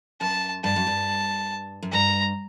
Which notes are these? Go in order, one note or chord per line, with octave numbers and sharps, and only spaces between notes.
F#2 A5
G2 A5
F#2
G2
F#2
G2 A#5